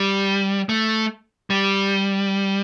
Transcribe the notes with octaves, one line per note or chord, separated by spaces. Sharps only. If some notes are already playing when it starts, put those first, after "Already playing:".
Already playing: G3
A3
G3